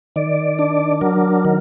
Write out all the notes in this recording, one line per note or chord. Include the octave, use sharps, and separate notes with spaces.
D#3 D5
D4
F#3 A#4
D#3